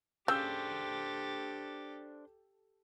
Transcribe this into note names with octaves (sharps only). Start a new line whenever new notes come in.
C#3 D4 G4 A4 C5 G5 E6 G6